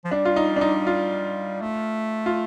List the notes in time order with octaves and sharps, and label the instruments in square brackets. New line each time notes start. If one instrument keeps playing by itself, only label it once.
[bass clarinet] F3
[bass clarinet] G3 [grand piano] D4
[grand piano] F4
D#4
D4
D#4
F4
[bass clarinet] A3
[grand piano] F4